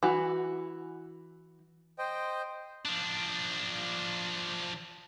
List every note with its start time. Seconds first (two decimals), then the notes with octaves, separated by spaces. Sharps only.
0.03 E3 F#4
1.98 C5 D#5 G5
2.85 F3 D4